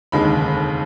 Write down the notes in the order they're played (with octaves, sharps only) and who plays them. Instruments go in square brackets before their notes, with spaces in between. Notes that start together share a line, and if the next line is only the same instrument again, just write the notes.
[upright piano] F1 D#2 D3 G#3 B5